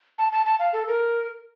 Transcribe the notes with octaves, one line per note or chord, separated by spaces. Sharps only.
A5
A5
A5
F5
A4
A#4